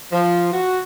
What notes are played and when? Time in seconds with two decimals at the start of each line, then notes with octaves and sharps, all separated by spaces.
0.13 F3
0.53 F#4